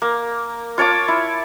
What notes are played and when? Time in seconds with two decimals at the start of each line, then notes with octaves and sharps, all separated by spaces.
0.02 A#3
0.78 F4 C#5 A5 D6
1.08 E4